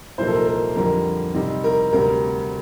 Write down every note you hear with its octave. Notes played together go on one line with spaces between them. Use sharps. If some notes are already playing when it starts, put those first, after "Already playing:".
C2 A#2 F3 A#3 D#4 C5
A4
A#4
A#4
F2 D3 G3 A#4
C3 G3 C4 D#4
A#4
D2 C3 G3 A#4